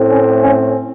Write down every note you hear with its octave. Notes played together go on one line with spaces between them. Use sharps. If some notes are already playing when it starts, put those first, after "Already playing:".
Already playing: A2 A3 C4
C#4
C#4